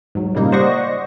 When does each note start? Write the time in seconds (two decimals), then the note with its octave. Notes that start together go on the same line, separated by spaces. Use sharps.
0.15 G#2 F#3
0.34 A#2 C#3 G3 A#3 D#4
0.52 C5 D5 D#5 F#5 C#6 A#6